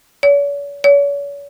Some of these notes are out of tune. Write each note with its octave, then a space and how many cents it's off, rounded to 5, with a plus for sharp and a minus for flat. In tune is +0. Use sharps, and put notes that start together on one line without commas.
C#5 +45
C#5 +40